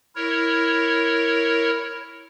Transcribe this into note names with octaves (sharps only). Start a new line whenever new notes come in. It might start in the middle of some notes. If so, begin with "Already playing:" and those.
E4 A#4 C#5